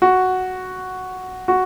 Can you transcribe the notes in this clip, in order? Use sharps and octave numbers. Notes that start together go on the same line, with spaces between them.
F#4
F#4